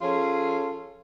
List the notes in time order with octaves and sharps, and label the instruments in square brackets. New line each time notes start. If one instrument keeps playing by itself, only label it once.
[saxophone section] F3 C#4 F4 G#4 A4 C#5